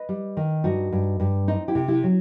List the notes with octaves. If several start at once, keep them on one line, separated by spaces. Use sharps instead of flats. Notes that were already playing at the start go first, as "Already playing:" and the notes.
Already playing: B4 D#5
G3
D#3
G2 D#4 F#4
G2
G2
C4 D#4
E4 G4
C3
E4 G4
F#3